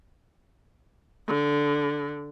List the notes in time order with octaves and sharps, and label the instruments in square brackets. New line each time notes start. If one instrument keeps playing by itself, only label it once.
[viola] D3